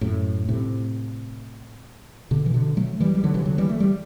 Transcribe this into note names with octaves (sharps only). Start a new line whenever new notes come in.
F#2 A2
A2 C3
B2 D3
E3
B2 D3
F#3 A3
E3 G3
G3
D3 F#3
C3 E3
D3 F#3
E3 G3
A3
G3